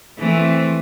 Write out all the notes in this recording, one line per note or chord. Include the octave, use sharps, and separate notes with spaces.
E3 A3 C4